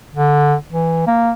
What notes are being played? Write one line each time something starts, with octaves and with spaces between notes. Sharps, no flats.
D3
E3
A#3